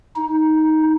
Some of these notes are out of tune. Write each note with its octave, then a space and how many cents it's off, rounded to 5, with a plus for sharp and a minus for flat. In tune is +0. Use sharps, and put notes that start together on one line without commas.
D#4 +10